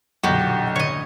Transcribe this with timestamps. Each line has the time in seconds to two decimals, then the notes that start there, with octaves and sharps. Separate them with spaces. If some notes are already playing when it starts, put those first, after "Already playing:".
0.24 B1 F#2 A#2 D3 F#4 G4
0.76 A2 D3 C#5 D#5